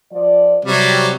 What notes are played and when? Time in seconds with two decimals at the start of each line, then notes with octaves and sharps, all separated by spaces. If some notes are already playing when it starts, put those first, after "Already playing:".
0.13 F3 D5
0.65 C3 F#3 G3